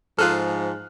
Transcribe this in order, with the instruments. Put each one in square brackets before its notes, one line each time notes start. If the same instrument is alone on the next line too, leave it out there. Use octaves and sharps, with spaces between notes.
[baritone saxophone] G#2 [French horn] F3 [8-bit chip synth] F4 G#4 A4 [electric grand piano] F6 F#6